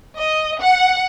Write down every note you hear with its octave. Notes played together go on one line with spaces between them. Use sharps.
D#5
F#5